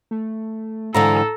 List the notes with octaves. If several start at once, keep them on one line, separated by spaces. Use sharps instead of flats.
A3
G#2 D3 E3 A4 F5 A#5